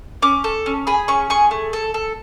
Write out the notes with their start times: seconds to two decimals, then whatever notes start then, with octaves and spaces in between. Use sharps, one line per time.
0.22 C#4 D6
0.44 A4
0.66 C#4
0.87 G#4 B5
1.08 C#4 C#6
1.30 G#4 C#6
1.51 A3
1.73 A4
1.94 A4